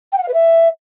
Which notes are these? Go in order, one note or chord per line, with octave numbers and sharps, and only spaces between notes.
G5
F#5
F5
B4
E5